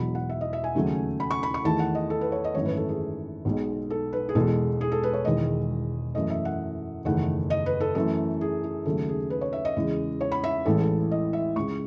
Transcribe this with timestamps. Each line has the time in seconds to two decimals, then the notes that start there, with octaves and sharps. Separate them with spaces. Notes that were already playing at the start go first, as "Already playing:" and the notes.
Already playing: E1 E2 B2 F#3 B5
0.15 F#5
0.29 E5
0.41 D#5
0.53 E5
0.64 G#5
0.75 D#2 C#3 F#3 A3
1.20 B5
1.31 C#6
1.43 B5
1.54 C#6
1.65 E2 D#3 A3 A5
1.79 F#5
1.95 D#5
2.10 A4
2.21 B4
2.32 C#5
2.44 D#5
2.54 G#1 F#2 E3 A3 C#5
2.66 B4
2.77 A4
2.89 G#4
3.45 B1 B2 G#3
3.90 A4
4.13 B4
4.29 G#4
4.35 E1 E2 B2 G#3 A4
4.81 G#4
4.92 A4
5.03 B4
5.13 C#5
5.25 E1 E2 D#3 G#3 D#5
6.15 F#2 E3 A3 D#5
6.30 E5
6.45 F#5
7.05 F#1 E2 D#3 A3 F#5
7.50 D#5
7.66 B4
7.80 A4
7.95 F#2 E3 A3 A4
8.41 G#4
8.64 G#4
8.85 D#2 C#3 F#3 A3 A4
9.09 G#4
9.30 B4
9.41 C#5
9.53 E5
9.65 D#5
9.76 E2 C#3 G#3
10.21 C#5
10.32 B5
10.44 E5
10.65 A1 A2 E3 G#3 A4
10.80 A4
11.11 D#5
11.33 E5
11.56 C#2 C#3 G#3 C#6